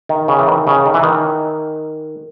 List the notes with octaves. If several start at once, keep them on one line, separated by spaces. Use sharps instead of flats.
D#3
C#3
E3
D#3
C#3
D#3
E3
D#3